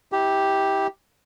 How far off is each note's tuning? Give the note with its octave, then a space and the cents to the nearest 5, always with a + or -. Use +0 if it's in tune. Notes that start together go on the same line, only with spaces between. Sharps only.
E4 -35 G4 +0